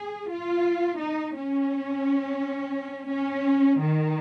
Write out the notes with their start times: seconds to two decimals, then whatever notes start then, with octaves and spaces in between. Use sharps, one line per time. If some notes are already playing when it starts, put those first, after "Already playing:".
Already playing: G#4
0.30 F4
1.00 D#4
1.36 C#4
3.10 C#4
3.80 D#3